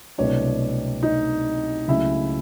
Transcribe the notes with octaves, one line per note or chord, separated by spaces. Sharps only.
C2 B2 F#3 A3 D4 C#5
D#4 D#5
C#2 C#3 F#3 A3 E4 E5